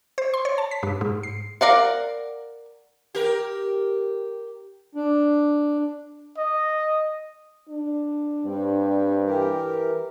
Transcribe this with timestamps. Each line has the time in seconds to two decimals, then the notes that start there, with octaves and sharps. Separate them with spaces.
0.18 C5
0.34 C6
0.45 C#5
0.58 A5
0.71 B6
0.83 G2
1.01 G#2
1.23 C7
1.61 A#4 D5 F5 F#5
3.15 G4 A#4
4.95 D4
6.38 D#5
7.69 D4
8.45 G2 G3 C4
9.26 E3 G4 A#4